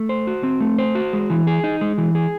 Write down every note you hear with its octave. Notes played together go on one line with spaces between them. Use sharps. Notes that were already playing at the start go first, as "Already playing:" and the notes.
Already playing: A3
C5
F#4
C4
A3
C5
F#4
G#3
E3
G#4
D#4
G#3
E3
G#4